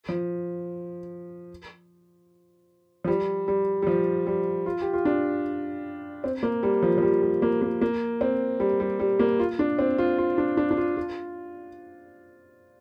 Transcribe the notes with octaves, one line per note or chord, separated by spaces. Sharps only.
F3
F3
G3
G3
G3
F3
G3
F4
G4
F4
D4
C4
A#3
G3
F3
F3
G3
G3
A#3
A#3
A#3
C4
G3
G3
G3
A#3
F4
D4
C4
F4
F4
D4
D4
D4
F4
F4